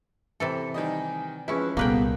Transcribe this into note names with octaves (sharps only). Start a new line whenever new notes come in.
C3 E3 A4
D#3 G3 D#5 G#5
F3 G#3 C#4 E4 B4
C2 A#2 A#3 B3 G#4 A4 B4 G5